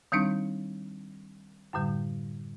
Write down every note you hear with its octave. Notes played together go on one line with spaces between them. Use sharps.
D#3 G3 C4 D4 D#4
F#2 A2 D3 G3